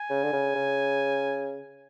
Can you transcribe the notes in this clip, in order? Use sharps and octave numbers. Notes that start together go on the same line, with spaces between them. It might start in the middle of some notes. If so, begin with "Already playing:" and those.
Already playing: G#5
C#3
D3
C#3
C#3